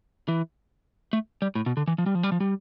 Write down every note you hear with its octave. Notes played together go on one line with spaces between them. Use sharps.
E3
A3
G3
A2
B2
D3
E3
F3
G3
F3
G3
F3
G3